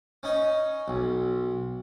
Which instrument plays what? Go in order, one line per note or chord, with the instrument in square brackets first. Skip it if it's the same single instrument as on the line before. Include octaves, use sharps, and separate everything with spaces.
[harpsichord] C#4 D#4 D#5
B1